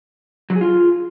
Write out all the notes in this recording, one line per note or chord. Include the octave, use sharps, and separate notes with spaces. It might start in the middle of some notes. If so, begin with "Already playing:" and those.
F#3
G#4
F4